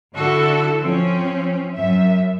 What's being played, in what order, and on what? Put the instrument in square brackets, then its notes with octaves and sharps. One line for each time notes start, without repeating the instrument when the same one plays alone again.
[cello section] D3 E4 F#4 A4
F3 C4 C#4
F#2 E5